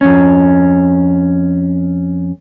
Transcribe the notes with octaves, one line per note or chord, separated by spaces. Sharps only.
F2 C#4